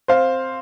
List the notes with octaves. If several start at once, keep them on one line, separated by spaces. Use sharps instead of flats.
C4 C5 F5